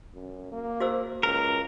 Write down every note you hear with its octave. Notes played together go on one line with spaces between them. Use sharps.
F#2
A#3
F#4 C5 E6
C#2 A#4